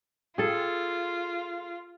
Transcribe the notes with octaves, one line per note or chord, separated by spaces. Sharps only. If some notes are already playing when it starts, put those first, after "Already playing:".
F4 G#4 A4